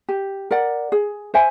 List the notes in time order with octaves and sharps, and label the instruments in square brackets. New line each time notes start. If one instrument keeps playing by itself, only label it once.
[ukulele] G4
A#4 D5 F#5
G#4
C5 E5 G#5